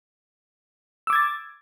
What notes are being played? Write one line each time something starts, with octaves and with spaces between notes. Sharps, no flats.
D6 E6 G#6 A6